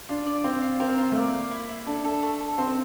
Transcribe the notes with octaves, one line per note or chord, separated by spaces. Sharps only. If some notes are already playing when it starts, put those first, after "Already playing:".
D4 F4
D5
C4 F4
F4
C4 A#4
F4
A3
A#3 D5
F5
E4
E4
D4 A4
A4
A3
A4
C4 C5